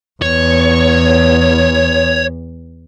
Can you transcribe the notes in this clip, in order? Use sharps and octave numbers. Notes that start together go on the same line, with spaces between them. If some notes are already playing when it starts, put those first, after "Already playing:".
E2 C#5